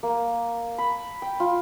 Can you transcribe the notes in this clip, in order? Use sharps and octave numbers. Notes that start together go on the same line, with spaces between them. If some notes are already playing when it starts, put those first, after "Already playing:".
A#3
B5
G5
F4